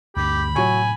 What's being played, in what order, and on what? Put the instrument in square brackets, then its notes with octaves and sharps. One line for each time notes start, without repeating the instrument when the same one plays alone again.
[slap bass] D2 G2 D3 [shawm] G4 [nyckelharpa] B5
[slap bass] A2 C3 [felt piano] F#3 C#6 [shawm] G#5